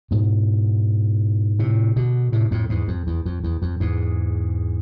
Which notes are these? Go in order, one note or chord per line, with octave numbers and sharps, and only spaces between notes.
G#2 B2
A2 C3
B2 D3
A2 C3
F2 A2
E2 G#2
F2
E2
F2
E2
F2
E2 G#2